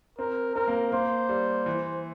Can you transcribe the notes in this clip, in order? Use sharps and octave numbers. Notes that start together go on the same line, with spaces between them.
C4 A#4
C4 A#4
A#3
A#3 C5
G3
E3